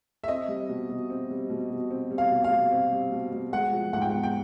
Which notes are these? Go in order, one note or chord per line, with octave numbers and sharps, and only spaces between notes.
E5
C4 D#5
G3
B2
B2
C4
G3
B2
B2
C4
G3
F5
B2
F5
B2
C4
G3
B2
B2
G#3 F#5
F3
G#2 F#5
G5
B3 F#5
G5